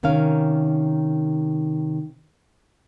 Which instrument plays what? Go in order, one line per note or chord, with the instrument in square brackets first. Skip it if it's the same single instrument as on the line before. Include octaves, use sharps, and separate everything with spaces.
[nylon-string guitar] C3 D#3 C#4 A#4 F5